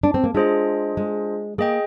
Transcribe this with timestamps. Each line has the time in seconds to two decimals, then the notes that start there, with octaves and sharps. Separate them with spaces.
0.03 D4
0.14 C4
0.24 A#3
0.35 G#3 D4 F4 G#4 C5 D#5
0.97 G#3
1.58 A#3 G#4 D#5 G5